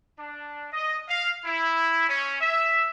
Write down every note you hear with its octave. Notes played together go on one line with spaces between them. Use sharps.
D4
D#5
F5
E4
C#4
E5